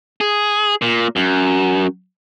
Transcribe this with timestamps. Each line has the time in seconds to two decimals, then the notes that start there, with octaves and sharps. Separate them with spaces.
0.21 G#4
0.82 A#2
1.16 F#2